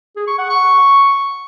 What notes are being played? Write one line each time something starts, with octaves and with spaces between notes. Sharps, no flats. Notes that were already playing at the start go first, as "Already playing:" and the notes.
G#4
C#6
F#5
C#6